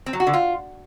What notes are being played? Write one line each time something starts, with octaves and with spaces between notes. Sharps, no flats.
C4
F#3
F#4
D3
F4